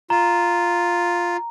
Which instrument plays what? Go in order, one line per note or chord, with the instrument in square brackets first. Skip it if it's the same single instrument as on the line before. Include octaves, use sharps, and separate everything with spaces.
[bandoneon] F4 [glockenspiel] A#5